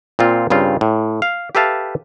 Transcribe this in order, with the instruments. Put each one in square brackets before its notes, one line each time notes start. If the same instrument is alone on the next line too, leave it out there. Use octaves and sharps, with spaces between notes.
[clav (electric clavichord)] A#2 C4 F4
G2 C#3 C4 F4
A2
F5
G4 A4 B4 E5 F5 A5